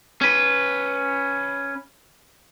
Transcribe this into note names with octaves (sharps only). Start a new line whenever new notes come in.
C#4 B4